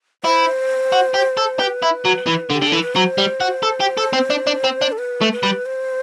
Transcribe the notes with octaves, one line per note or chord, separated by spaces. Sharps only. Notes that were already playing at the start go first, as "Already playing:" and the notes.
E4 C5
F#4
G4
A4
G4 B4
E4
F#3
E3
D3
G4
D3
E3 A4
B4
F#3 C5
G3
F#4
A4
G4
A4
C4
D4
D4
C4
D4
A4
B4
A3
B4
G3
C5